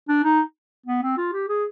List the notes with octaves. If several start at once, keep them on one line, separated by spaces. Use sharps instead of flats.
D4
D#4
B3
C4
F4
G4
G#4